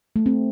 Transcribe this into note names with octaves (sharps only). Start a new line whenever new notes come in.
A3
C4